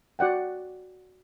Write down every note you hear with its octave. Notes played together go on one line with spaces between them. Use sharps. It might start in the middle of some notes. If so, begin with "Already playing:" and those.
F#4 D5 F#5 G5